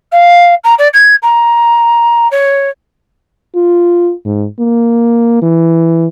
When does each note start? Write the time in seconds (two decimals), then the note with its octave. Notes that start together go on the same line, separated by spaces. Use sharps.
0.12 F5
0.64 A#5
0.78 D5
0.94 G#6
1.22 A#5
2.31 C#5
3.55 F4
4.25 G#2
4.60 A#3
5.42 E3